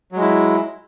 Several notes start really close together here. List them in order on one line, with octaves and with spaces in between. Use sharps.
F#3 G#3 E4